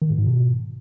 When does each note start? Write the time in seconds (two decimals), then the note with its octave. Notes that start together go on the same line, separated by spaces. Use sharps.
0.02 D#3
0.10 A2
0.18 G#2
0.26 B2